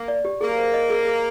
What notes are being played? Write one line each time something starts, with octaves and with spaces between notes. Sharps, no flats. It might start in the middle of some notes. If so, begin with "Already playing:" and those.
Already playing: A#3
D5
G4
A#3 G#4
C5
D#5
G#4
G#4